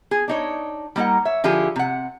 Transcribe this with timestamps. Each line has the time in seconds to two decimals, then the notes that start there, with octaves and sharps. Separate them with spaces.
0.11 G#4
0.28 D4 D#4 C#5
0.96 G3 A#3 D#4 G#4 A#4 F#5
1.25 C#5 E5
1.44 D3 F3 E4 G4 G#4
1.76 C3 F#5